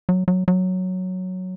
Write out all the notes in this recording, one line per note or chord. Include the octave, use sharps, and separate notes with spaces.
F#3
F#3
F#3